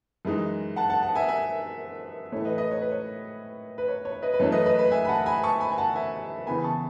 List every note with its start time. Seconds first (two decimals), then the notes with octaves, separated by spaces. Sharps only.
0.25 F#2 E3 G#3 D#4
0.76 F#5 A5
0.90 F#5 A5
1.03 F#5 A5
1.15 E5 G#5
1.28 E5 G#5
2.32 A2 E3 A3 C#5
2.45 B4 D#5
2.58 B4 D#5
2.71 C#5
2.81 B4
2.92 C#5
3.78 B4
3.88 C#5
4.05 C#5
4.22 B4 D#5
4.34 B4
4.40 F#2 E3 A3 C#4 C#5
4.52 B4 D#5
4.66 B4 D#5
4.79 B4
4.92 E5 G#5
5.05 B5
5.09 F#5 A5
5.26 G#5 B5
5.43 A5 C#6
5.60 G#5 B5
5.72 G#5
5.78 F#5 A5
5.95 E5 G#5
6.47 E2 C#3 E3 B3 G#5 B5
6.64 A5 C#6